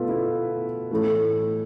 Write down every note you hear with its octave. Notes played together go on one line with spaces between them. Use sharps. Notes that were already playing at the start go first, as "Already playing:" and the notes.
Already playing: B2 A3 F4 A4 B4
E4
A2 E3 A3